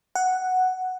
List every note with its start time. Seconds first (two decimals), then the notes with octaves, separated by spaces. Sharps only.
0.15 F#5